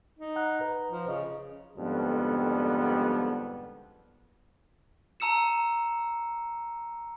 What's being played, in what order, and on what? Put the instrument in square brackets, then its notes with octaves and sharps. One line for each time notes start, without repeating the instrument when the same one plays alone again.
[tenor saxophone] D#4
[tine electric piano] F#5 A#5 F#6
B4 A#5
[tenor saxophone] F3
[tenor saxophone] C#3 [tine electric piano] D#5
[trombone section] F2 G#2 D3 G3 B3
[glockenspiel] A5 A#5 E6 C#7 E7